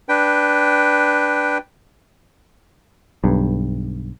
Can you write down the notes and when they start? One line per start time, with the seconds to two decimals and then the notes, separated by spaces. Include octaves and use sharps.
0.09 D4 B4 G5
3.24 B1 G2